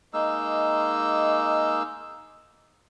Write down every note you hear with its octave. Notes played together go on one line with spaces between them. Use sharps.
G#3 A#3 D#4 E6